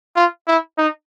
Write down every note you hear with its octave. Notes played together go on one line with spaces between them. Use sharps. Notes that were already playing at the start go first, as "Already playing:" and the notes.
F4
E4
D#4